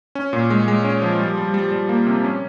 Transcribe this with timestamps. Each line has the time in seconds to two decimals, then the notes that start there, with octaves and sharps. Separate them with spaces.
0.15 C#4
0.33 A#2
0.50 G#3
0.68 G#3
0.85 C#4
1.02 F3
1.20 G3
1.37 G3
1.54 G3
1.72 G3
1.89 A#3
2.07 C3
2.24 C#4